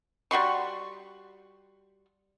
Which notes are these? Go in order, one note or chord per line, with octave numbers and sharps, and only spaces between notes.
G3 F#4 C6 C#6